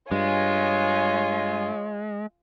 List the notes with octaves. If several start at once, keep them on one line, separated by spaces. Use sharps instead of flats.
G2 G#3 F4 C#5 G#5